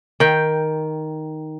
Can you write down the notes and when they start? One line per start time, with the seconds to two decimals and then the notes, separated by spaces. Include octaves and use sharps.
0.20 D#3 G5